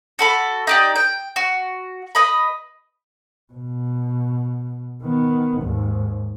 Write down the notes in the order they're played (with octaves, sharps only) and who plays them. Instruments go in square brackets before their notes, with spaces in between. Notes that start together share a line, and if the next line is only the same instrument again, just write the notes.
[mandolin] F#4 A4 B5
D#4 G4 D5
G5
F#4
B4 D#5 B5
[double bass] B2
D#3 B3
D#2 G#2